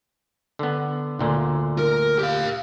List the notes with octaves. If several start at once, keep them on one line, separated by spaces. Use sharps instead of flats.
D3 B3
D2 A#2 D3
A#4
G4 F5